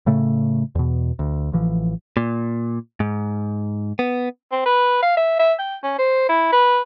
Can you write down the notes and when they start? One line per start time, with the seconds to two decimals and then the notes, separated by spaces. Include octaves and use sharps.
0.06 A2 C#3 A3
0.75 E2 B2
1.19 D2
1.53 A1 E3 F3
2.17 A#2
3.00 G#2
3.99 B3
4.52 C4
4.66 B4
5.03 F5
5.17 E5
5.39 E5
5.59 G5
5.83 C#4
5.98 C5
6.29 E4
6.52 B4